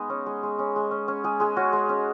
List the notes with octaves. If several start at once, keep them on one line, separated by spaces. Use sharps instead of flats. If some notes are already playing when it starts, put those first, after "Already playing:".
Already playing: G#3 B3 D#4 G#4
C#4
G#3
G#3
C#4
G#3
C#4
C#4
G#3 G#4
G#3 G#4
C#4 F#4
G#3
C#4